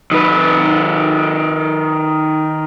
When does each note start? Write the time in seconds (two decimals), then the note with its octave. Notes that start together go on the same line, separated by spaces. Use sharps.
0.11 D#3 B4